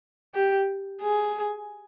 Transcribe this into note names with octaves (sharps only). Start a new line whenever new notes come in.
G4
G#4